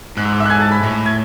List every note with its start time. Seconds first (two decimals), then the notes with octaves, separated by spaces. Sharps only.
0.17 G#2 F#6
0.25 E6
0.32 D6
0.40 E5 E6
0.46 F#6
0.50 G#5 G#6
0.61 A5 A6
0.72 B5 B6
0.83 A2
1.06 G#6